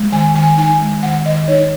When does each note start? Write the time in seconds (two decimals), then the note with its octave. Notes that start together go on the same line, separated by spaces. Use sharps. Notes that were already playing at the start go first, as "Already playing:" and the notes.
Already playing: G#3
0.12 D#3 G#5
0.35 D#3 G#5
0.57 D#4 G#5
0.80 G#3
1.03 D#3 F#5
1.25 D#3 D#5
1.48 D#4 C#5